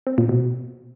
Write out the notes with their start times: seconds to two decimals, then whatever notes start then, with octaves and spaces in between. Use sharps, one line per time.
0.07 C4
0.18 A#2
0.29 B2